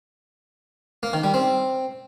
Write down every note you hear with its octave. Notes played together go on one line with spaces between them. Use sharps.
A#3
D#3
G3
C4